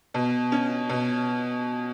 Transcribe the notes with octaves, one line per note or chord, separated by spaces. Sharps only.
B2
C#4
B2